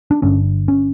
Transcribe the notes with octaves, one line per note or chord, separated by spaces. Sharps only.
D4
G1 G2 D3 C#4
C#4